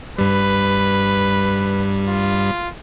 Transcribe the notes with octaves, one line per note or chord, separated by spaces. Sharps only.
G2 G3 B4
F4